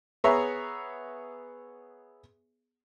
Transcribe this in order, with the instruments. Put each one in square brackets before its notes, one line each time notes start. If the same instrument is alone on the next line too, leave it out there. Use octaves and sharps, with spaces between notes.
[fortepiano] B3 G#4 C#5 E5 A#5